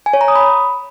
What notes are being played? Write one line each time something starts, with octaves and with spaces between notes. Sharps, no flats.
G#5
C#5
A#5
D#6
B5